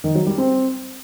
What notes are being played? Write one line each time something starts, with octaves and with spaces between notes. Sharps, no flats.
D#3
F#3
G3
C4